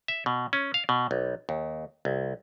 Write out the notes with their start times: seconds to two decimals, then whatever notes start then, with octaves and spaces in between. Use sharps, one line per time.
0.08 E5
0.26 B2
0.53 C#4
0.74 F5
0.89 B2
1.11 B1
1.49 D#2
2.05 C2